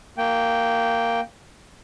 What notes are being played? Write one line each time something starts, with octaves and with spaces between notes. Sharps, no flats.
A#3 G5